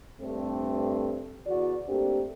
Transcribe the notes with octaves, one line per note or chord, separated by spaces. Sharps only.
G2 A3 C4
E2 F#4 D5
A3 A#3 C4 D4 G4